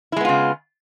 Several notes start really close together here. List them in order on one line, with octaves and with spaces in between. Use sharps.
E4 G#3 B3 F4 C#3